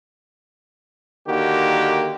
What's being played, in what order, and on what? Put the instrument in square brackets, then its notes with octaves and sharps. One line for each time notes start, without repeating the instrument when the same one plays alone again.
[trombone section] D3 D#3 A#3 F#4 G4